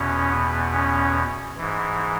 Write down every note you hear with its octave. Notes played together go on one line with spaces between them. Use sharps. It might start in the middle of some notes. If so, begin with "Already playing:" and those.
Already playing: E2 B2 C#4
B3
C#4
G#2 E3